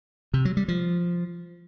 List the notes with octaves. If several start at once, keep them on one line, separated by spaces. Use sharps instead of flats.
C3
F#3
G3
F3